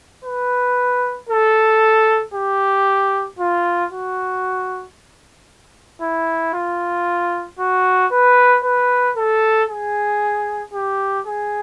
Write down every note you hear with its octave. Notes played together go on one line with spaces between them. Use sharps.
B4
A4
G4
F4
F#4
E4
F4
F#4
B4
B4
A4
G#4
G4
G#4